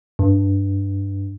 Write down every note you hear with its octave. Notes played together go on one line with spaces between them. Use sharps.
G2